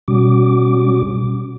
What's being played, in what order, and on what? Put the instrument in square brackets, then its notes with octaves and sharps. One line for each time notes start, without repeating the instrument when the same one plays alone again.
[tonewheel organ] B2 G3 C#4 F#4 D6